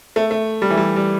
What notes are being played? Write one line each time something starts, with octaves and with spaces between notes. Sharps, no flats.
A3
A3
G3
E3
G3
G3